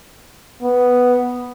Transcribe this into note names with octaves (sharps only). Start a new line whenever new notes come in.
B3